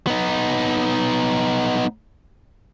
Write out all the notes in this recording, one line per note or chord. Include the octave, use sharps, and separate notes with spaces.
B3 D#4